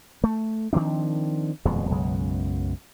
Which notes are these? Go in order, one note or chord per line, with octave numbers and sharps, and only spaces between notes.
A3
D#3 F3 C4 D4
D#1 F2 B2 G#3
B1 F#2 C#3 G#3